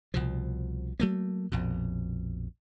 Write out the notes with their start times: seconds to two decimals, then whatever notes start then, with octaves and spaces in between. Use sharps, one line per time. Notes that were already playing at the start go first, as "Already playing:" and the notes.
0.14 C2 B2 F3
1.00 F#3 A3 A#3
1.52 A#1 F2 B2